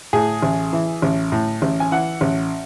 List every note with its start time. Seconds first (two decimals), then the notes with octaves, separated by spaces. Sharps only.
0.13 A2 G#4
0.42 A1
0.73 E3
1.02 A1
1.32 A2
1.62 A1
1.80 G#5
1.92 E3 F#5
2.21 A1